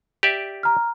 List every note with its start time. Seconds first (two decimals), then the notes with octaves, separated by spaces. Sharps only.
0.23 G4 D5 E5
0.63 A#5 F6